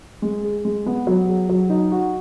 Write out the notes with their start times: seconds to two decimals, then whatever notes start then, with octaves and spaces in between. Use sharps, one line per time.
0.22 G#3
0.44 G#4
0.65 G#3
0.86 B3
1.07 F#3
1.28 G#4
1.49 F#3
1.70 D#4
1.92 F#4